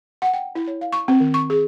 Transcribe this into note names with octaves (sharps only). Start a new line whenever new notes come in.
F#5
G5
E4
C#5
F5
C#6
C4
D#3
C#6
G#4